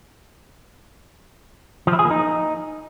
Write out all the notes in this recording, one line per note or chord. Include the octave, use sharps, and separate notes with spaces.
F3
E4
G#4
A#3
D#4